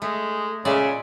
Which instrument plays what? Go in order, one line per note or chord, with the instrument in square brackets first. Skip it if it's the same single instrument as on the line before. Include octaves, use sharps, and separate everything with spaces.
[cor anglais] G#3 [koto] A3
[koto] A#2 G#3 D5 [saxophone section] C#3 [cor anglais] E5